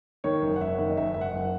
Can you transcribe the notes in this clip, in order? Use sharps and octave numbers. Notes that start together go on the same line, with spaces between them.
D#3 C#5
F#1
F#5
F#1 E5
D#3
D#5
F#1 E5
F#1 E5
F#5
F#1